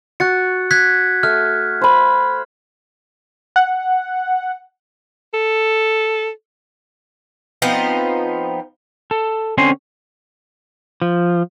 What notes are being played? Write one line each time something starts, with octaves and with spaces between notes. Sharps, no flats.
F#4 F#6 A6 C#7
F#6 G#6 B6
A3 F6
C5 B5
F#5
A4
F3 B3 C4 D#4
A4
D3 C4 C#4 G#5 C6
F3